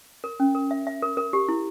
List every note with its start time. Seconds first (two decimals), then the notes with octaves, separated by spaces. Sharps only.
0.24 A#4
0.40 C#4
0.55 A#4
0.71 E5
0.87 E5
1.02 A#4
1.17 A#4
1.33 G4
1.49 E4